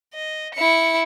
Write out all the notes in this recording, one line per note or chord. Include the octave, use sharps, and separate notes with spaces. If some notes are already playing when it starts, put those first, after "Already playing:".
D#5
E4 C#7